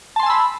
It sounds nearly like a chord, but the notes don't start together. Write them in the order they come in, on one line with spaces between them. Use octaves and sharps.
A5 C6 G#5 E6 B5